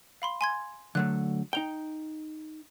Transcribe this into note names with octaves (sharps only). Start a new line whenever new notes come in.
F5 B5 C6
G#5 C6 G#6
D3 F#3 A3 F#6
D#4 G5 F7 G7